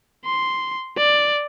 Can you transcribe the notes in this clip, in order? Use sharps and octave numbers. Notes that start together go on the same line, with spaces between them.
C6
D5